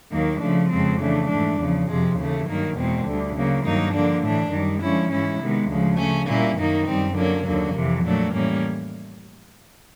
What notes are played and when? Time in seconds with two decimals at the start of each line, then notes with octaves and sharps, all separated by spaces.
0.12 D#2 D#3 F#3 A#3
0.41 C#3 F3 A3 D4
0.70 F2 C#3 F3 G#3 C4
1.00 C#3 E3 A3 D4
1.29 G#2 E3 A3 D4
1.58 E2 C#3 F3
1.88 F2 C3 F3 G#3
2.17 D#2 C#3 E3 A3
2.46 G2 D#3 F#3 A#3
2.76 E2 B2 G#3 C4
3.05 D2 D3 G3
3.35 C#3 F#3 A#3
3.64 G2 D#3 F#3 A#3 D#4
3.93 D3 F3 A#3 D4
4.23 A2 E3 A3 D4
4.52 F#2 D#3 G3
4.81 D3 F3 G#3 C#4 E4
5.10 G#2 E3 G#3 C#4 E4
5.40 C3 D#3 G#3 B3
5.69 D2 C#3 F3 G#3
5.98 C#3 F3 A3 C#4
6.28 A#2 G3 A#3 C#4 E4
6.57 F#2 D#3 F#3 A#3 D#4
6.86 F#2 D#3 G3 C4
7.16 D3 F#3 A#3 C#4
7.45 D#2 D3 F#3 A#3
7.74 F2 C3 E3
8.03 A#2 F#3 A3 D4
8.33 A2 E3 G3 A#3 C#4